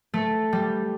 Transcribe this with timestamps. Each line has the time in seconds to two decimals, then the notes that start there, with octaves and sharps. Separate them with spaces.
0.14 A3
0.53 G3